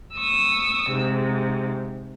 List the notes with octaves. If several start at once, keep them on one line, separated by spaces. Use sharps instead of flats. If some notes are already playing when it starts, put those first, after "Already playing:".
C#6 D#6 E6
G#2 C3